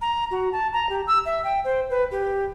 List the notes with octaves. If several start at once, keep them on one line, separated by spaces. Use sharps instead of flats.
A#5
F#4
A5
A#5
G4
E6
E5
G5
C5
B4
G4